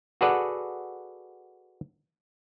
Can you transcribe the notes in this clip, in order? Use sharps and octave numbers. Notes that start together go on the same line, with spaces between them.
F#4 G#4 A4 B4 D5 F#5